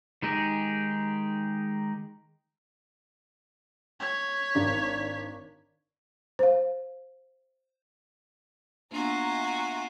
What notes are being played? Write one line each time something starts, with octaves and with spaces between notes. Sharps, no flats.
D#3 G#3 D#4 G4 G#4
C#5 B6
G#1 D4
C5 F5
A#3 B3 D4 F4 F#4 E5 G#5 A#5